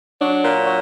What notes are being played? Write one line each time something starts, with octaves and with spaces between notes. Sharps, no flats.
F#3 D4
A#2
F#3